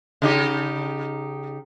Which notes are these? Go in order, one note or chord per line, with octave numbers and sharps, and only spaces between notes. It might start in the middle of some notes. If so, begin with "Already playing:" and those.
C#3 D#4 G4